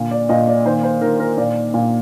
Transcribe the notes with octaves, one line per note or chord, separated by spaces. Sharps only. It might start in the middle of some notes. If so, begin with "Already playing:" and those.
Already playing: A#2 D3
D5
A#2 D#5
D5
D#3 C5
C5
D#3 A#4
A#4
A#2 D5
A#2